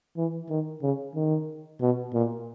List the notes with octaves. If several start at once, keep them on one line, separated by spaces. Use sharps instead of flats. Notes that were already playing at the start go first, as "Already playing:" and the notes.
E3
D#3
C#3
D#3
B2
A#2